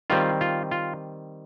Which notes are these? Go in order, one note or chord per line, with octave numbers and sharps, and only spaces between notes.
D#3 G3 C4 F4
F4
F4